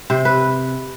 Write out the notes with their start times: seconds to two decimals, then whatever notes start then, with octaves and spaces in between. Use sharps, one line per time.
0.10 C3 C5
0.25 B4